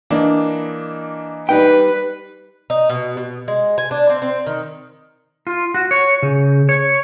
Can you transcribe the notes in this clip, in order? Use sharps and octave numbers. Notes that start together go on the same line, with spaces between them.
E3 A#3 D4 D#5
G3 D#4 B4 G5
D#4
B2
B2
G#3
G#5
D4
C4
C4
D#3
F4
F#4
C#5
C#3
C#5